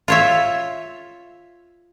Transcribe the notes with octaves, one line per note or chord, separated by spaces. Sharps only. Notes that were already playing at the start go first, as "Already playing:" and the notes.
F4 C#5 E5